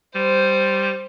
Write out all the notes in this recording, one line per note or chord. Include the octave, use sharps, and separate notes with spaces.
G3 C5